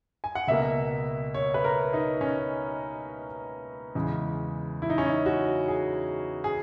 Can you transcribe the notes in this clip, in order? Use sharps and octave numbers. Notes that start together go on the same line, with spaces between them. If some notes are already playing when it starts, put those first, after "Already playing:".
G#5
F#5
C#2 B2 A#3 E5
C#5
B4
A#4
D#4
C#4
E2 C#3 G#3
E4
D#4
C#4
D#4
F#4
G#4
G#4